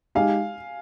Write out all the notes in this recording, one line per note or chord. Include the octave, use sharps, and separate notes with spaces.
G#3 D#4 G4 F5 G#5